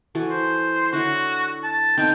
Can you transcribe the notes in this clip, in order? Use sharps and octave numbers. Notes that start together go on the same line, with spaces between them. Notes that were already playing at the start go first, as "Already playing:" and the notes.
E3 F#4 A4
C5
D3 E4 F#4 C#5
A5
D3 C4 D#4 G5